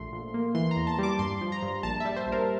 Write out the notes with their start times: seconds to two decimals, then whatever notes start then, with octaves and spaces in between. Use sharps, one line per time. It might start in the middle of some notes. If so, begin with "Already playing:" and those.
Already playing: A#1 A3 C6
0.13 A#1
0.34 A#3
0.55 E3 C6
0.71 A#5
0.76 E2
0.87 A5
0.99 G3 D6
1.19 G2 C6
1.41 F3
1.52 A#5
1.62 G2
1.83 A#1 A5
2.00 G3 E5
2.16 C5
2.27 A#1
2.32 A#4